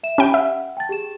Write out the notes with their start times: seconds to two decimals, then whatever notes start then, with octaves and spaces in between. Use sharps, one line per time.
0.03 E5 E7
0.18 C#4 G4 G5 B5
0.34 E5 F#5
0.77 G5 A5 A6
0.89 G4 G#4 E7